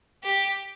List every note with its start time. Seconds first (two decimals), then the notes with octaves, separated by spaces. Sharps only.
0.24 G4